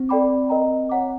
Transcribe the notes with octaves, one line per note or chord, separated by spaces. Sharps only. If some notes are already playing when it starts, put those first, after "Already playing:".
Already playing: C4
A4 D5 G5 B5 D6
A#4 D#5 G5 A#5
C#5 F#5 A#5 D6